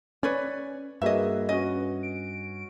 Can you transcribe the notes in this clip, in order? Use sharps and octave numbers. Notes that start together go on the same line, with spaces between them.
C#4 B4 C#5 D5
G2 A#3 F#4 G#4 B4 D#5 E5
C#4 F#4 D#5
D7